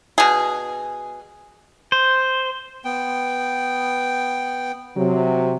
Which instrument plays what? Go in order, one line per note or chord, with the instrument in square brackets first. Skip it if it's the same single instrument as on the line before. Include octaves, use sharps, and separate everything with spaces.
[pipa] B2 G#4
[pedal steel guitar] C5
[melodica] B3 G5
[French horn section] C3 F#3